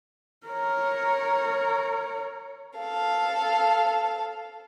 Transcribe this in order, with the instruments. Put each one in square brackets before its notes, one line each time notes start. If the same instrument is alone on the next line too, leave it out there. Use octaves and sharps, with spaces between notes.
[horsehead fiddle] A#4 C#5
[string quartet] A4 F5